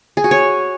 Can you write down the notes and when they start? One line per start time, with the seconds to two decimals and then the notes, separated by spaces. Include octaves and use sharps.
0.17 G#4
0.24 F#4
0.31 C#5